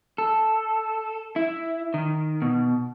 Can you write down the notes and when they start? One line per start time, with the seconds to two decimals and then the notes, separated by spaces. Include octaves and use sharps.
0.18 A4
1.36 E4
1.94 D#3
2.42 B2